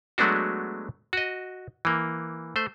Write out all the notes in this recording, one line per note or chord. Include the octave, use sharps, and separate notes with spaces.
F#3 G#3 A3 B3 D4 F#4
F#4 D#5
E3 A#3
A3 C5